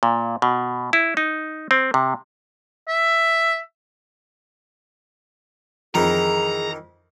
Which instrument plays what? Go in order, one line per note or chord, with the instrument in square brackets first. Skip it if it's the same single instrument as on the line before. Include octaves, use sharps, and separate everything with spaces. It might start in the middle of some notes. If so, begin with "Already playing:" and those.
[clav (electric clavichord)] A#2
B2
E4
D#4
C4
C3
[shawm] E5
[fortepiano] F2 [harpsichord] D#3 E3 [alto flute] G#4 [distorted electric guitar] A#5